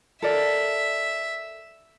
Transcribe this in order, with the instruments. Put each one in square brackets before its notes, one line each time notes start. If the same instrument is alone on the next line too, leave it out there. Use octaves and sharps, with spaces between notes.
[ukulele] A4 A#4 D5 [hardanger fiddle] E5